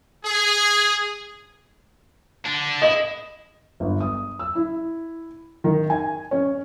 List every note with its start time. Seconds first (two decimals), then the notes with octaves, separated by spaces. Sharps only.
0.25 G#4
2.45 D3 D4
2.82 E4 D#5
3.80 G1
4.01 D#6
4.39 E6
4.55 E4
5.64 D#3
5.90 G#5
6.31 C#4